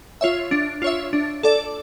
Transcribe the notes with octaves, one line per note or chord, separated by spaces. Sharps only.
F4 C#5 E5
D4
F4 C#5 E5
D4
A4 D5